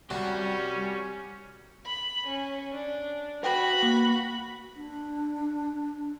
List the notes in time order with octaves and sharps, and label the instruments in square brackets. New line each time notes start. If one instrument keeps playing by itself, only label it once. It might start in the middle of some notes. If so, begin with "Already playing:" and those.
[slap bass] C2 [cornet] C#4 [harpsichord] F#4 [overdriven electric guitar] G4 D5
[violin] B5
C#4
D4
[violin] F#4 B5 [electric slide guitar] B4 F5 G5
[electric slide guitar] A#3
[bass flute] D4